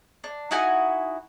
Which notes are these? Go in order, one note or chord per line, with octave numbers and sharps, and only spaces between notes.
D4
D#4 E4 F#4 G#5